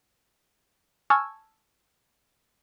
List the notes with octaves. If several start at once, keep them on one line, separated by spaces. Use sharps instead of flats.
G#5 A5 C#6 E6 F6 G#6